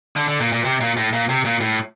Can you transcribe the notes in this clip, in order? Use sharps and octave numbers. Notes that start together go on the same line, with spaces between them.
D3
D3
A#2
A#2
C3
A#2
A2
A#2
C3
A#2
A2